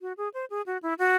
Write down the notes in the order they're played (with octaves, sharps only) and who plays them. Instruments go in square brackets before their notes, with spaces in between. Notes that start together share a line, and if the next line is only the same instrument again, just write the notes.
[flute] F#4
G#4
C5
G#4
F#4
E4
F#4